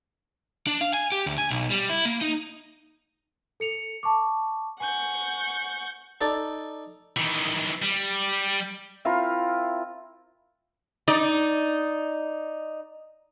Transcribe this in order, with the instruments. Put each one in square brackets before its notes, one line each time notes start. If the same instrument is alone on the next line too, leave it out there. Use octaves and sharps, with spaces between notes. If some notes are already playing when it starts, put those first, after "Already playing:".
[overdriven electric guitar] D4
F5
G#5
G4
D2
G#5
B1
G3
E4
A#3
D#4
[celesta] A4 C#7 F7
A5 C#6 D6
[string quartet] F#5 C#6 G6 [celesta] G#5
[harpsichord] D#4 A4 D5
[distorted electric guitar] D#3 E3
G3
[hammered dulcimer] C4 E4 F4 A#4
[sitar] D#4 D5